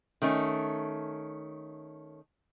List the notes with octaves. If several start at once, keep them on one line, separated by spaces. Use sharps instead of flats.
D#3 A3 C#4